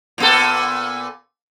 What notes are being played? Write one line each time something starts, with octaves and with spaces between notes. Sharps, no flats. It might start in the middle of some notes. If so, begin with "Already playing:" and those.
A#2 B3 A4